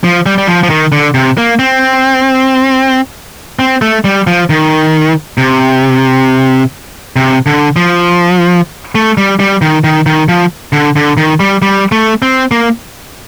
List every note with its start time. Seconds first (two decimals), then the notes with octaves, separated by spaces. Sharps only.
0.04 F3
0.26 G3
0.38 G3
0.47 F3
0.63 F3
0.70 D#3
0.92 D3
1.14 C3
1.38 A#3
1.59 C4
3.59 C4
3.82 A3
4.04 G3
4.27 F3
4.50 D#3
5.38 C3
7.16 C3
7.46 D3
7.76 F3
8.95 A3
9.18 G3
9.40 G3
9.62 D#3
9.84 D#3
10.06 D#3
10.29 F3
10.73 D3
10.96 D3
11.17 D#3
11.40 G3
11.62 G3
11.92 A3
12.22 C4
12.51 A#3